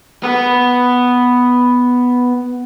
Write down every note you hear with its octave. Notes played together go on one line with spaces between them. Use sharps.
B3 B4